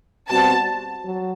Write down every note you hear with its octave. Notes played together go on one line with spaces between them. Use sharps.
B2 G3 C4 F#4 C5 A5
F#3